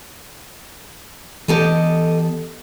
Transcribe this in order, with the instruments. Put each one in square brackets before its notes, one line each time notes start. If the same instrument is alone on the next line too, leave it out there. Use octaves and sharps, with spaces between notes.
[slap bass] E3 B3 [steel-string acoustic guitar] G4 A4 D#5